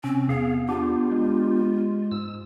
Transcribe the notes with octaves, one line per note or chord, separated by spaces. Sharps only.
C3 C4 C#4
E2 B3 G#4 F5
B3 D4 F4 G4
G#3
G#2 E6